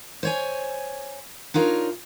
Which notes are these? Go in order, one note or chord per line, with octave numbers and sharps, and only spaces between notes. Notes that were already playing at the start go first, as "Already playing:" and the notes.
C5 C#5 G#5
D4 D#4 F4 A#4 C#5